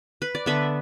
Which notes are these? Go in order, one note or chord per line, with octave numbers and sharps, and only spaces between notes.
B4
D5
D3 B3 B4 E5